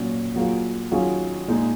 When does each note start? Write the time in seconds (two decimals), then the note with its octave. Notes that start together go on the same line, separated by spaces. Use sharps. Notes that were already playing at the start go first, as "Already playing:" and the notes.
Already playing: A#2 F#3 C#4
0.36 F#3 A#3 F4 G#4
0.92 D#3 F#3 C#4 F4 G#4
1.48 A#2 G#3 D#4 G#4